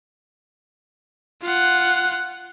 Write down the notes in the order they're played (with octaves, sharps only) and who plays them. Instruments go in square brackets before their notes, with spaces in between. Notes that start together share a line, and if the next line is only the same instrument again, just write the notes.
[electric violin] F4 F#5